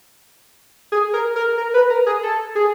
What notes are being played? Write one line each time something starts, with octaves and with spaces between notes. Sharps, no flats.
G#4
A#4
A#4
A#4
B4
A#4
G#4
A4
G#4